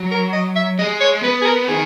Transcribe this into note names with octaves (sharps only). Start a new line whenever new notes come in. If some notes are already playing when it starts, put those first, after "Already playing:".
Already playing: F#3
A#4
D#5
E5
G#3 D#5
C#5
B3 B4
G#4
A#4
D#3 G#4